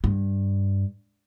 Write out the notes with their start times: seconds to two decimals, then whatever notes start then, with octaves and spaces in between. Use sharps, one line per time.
0.04 G2